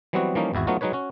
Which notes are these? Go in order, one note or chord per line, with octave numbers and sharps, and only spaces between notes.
E3 F#3 G3 B3 C4 F#4
E3 F3 G3 A#3 C#4 D#4
G#1 E2 E4 F#4
F#3 A3 B3 D#4 F4 F#4
F#3 G#3 D#4 B4 C#5
C#4 F#4